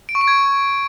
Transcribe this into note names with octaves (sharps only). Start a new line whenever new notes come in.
D7
C#6
D7
G#6